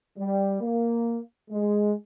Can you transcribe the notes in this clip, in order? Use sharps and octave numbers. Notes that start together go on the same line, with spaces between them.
G3
A#3
G#3